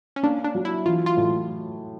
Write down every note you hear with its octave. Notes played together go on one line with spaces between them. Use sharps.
C#4
A#3 D4
D4
F#3
E4
E3 F4
F4
A2